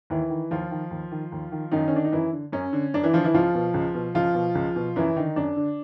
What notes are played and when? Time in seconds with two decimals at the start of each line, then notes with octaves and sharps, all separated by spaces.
0.10 D#2 E3 E4
0.30 D#3
0.51 D#2 F3 F4
0.71 D#3
0.91 D#2
1.11 D#3
1.32 D#2
1.52 D#3
1.72 F#2 D#3 D#4
1.88 C#4
1.92 D3 D4
2.05 D#4
2.12 F#2 E3 E4
2.32 D3
2.52 F#2 C#4
2.73 D3
2.94 F#2 D4
3.03 E3 E4
3.13 D3 F3 F4
3.24 E3 E4
3.34 C#2 F3 F4
3.55 B2
3.74 C#2
3.95 B2
4.15 C#2 F3 F4
4.35 B2
4.55 C#2
4.76 B2
4.96 F#2 E3 E4
5.16 D3 D#3 D#4
5.36 F#2 D4
5.56 D3